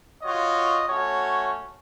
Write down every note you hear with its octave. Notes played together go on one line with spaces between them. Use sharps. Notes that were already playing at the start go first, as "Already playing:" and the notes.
F4 F#4 C#5 D#5
A3 C#4 F#4 C#5